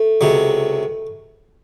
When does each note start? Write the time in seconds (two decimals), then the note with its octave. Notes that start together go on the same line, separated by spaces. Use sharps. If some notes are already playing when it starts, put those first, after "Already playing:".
Already playing: A3
0.21 C#2 C3 F#3